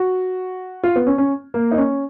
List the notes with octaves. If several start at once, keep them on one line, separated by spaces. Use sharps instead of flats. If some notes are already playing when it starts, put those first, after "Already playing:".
Already playing: F#4
F4
B3
C#4
C#4
A#3
D#4
C#4